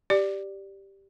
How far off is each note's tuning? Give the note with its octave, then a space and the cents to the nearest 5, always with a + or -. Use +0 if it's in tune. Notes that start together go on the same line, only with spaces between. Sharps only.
G4 +0 D5 +0